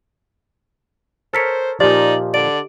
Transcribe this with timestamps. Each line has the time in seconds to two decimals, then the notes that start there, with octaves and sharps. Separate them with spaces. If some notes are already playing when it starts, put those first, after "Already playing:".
1.34 A4 A#4 C5 C#5 F6 B6 C#7
1.80 A#2 F3 D#4 G4 D5 D#5
2.34 D3 D5 D7